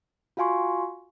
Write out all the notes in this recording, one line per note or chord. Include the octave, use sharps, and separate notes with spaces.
F4 F#4 F5 G#5 C6 C#6